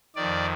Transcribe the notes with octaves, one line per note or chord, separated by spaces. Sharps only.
F2 D#3 D5